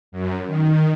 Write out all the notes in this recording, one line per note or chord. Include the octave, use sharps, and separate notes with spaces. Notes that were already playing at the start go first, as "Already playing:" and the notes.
F#2
D#3